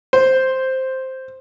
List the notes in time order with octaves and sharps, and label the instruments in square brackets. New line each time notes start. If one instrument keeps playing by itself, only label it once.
[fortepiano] C5